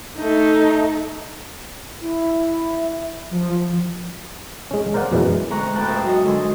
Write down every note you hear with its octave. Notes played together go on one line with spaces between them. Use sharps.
A3 D#4
E4
F3
F3
G#3 C#4
A#4 C5 D5 F5 F#5
F#2 B2 E3 F#3 G#3
D2 G#3 C4 A#5 C#6 F#6
A2 B3 F4 G5 A5 F#6
C#4 D#4 A4 A#4 C5 E5
F#2 F#4 A4 D#5
D3 G#3 D4 A4 G#5 C6